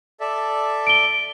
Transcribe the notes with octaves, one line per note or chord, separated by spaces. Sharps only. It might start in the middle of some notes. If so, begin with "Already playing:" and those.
A4 D5 E5
D7 G7